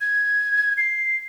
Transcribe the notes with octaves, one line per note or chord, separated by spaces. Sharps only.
G#6
C7